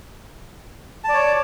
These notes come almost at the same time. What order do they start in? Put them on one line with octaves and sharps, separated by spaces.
A5 D5 C#5